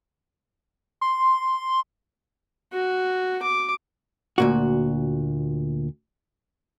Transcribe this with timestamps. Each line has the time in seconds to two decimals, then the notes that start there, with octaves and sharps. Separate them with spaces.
1.01 C6
2.73 F#4
3.43 D6
4.38 D2 A#2 F#4